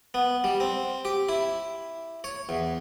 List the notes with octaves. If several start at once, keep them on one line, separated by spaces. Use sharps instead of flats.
B3
G3
C4
G4
E4
C#5
E2